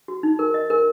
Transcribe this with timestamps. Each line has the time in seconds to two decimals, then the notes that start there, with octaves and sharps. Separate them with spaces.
0.08 F#4
0.23 D#4
0.39 A#4
0.54 D#5
0.70 A#4